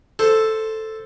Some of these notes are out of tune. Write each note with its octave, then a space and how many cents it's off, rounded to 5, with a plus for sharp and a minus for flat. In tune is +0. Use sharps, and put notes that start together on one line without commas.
A4 +0 C5 +0